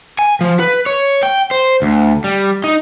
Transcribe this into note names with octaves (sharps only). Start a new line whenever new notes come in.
G#5
F3
B4
C#5
G5
C5
D2
G3
D#4